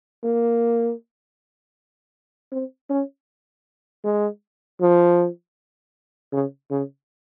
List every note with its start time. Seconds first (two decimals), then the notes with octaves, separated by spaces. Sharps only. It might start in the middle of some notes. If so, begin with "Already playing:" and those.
0.24 A#3
2.52 C4
2.90 C#4
4.04 G#3
4.81 F3
6.32 C#3
6.71 C#3